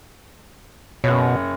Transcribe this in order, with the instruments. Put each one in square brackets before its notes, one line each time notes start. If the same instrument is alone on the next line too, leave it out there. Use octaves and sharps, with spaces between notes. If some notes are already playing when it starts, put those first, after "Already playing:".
[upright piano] F#1 C#5 [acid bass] B2